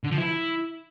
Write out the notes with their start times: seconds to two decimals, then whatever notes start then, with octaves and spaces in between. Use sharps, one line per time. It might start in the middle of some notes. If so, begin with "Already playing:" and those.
0.04 D3
0.11 F3
0.18 E4